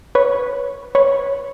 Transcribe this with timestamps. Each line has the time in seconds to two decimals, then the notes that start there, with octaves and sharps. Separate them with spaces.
0.15 B4 C#5
0.95 B4 C#5